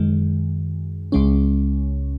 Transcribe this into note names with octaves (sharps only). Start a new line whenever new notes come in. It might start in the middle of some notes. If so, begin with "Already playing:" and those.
Already playing: F#2 D#3 G#3
C#2 C#3 G#3 C#4